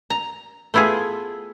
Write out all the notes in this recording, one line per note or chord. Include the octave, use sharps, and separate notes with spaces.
A#5
A3 B3 E4 F4 G#4